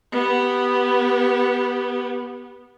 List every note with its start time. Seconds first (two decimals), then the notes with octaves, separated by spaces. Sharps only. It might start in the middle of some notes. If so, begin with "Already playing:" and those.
0.12 B3 G4